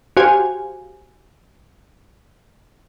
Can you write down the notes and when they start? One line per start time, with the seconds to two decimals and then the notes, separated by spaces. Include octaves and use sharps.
0.17 F#4 G4 C5 F5 G#5